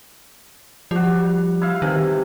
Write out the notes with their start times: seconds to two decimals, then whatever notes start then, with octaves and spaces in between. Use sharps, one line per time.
0.91 F3 G3 F#4
1.61 E4 F5
1.82 C3 D#3 E3